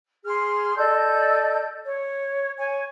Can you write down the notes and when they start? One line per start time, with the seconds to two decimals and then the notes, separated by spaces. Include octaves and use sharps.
0.25 G#4 C6 F6
0.76 A4 D5 D#5 G6
1.84 C#5
2.57 C#5 G#5